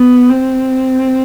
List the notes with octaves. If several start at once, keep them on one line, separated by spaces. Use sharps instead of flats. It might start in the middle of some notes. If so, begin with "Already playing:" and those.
Already playing: B3
C4